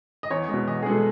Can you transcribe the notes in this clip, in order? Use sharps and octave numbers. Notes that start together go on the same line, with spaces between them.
D#5
E2 C#5
B2 G#3 D#5
E2 D#5
G#4
B2 G#3 A4